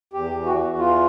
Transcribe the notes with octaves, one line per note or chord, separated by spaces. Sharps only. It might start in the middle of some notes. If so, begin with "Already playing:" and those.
E2 G4
E3
F#4
E2
E3 F4